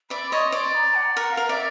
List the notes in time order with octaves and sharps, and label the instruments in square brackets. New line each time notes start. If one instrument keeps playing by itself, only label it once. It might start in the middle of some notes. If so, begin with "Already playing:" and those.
[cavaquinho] D5 E5 [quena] B5
[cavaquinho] C#5 D#5 [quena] C6
[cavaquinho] D5 [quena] C6
[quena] A#5
F#5
[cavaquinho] A#4 [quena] F#5
[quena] F5
[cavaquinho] A#4
[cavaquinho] D5 [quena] E5